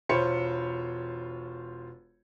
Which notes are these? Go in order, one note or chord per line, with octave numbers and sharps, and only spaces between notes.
E1 F4 C5 C#5 B5 C#7